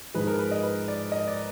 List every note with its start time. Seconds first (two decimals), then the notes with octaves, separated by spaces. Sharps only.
0.14 G#2 F3 G#3 B4
0.27 A#4
0.39 B4
0.51 D#5
0.63 B4
0.88 D5
1.12 D#5
1.28 D5